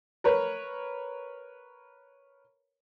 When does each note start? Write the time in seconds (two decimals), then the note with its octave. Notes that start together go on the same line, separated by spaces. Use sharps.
0.24 A#4 B4 C#5